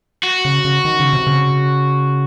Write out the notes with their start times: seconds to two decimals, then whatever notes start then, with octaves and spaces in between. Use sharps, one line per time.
0.24 F#4
0.45 C#3
0.65 C#3
0.85 D#3
1.00 C#3
1.13 C3
1.27 C#3